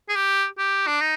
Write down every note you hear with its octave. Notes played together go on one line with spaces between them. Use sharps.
G#4
G4
G4
D4
D#4